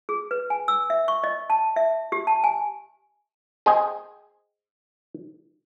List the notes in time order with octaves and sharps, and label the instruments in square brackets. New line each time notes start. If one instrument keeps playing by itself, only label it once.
[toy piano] G#4
B4
G#5
E6
E5
C#6
D#5
A5
E5
G4
A5
G#5
[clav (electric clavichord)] G#4 C5 D#5 G5 G#5